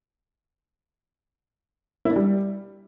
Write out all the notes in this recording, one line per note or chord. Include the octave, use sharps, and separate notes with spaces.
E4
D4
G3